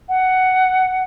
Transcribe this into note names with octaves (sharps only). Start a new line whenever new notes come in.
F#5